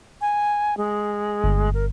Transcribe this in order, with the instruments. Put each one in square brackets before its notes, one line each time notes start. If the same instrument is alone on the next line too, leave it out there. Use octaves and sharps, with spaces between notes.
[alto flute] G#5
G#3
[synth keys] G1
[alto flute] A#4